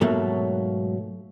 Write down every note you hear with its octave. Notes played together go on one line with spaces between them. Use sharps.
G#2 B2 F#3 A3 A#3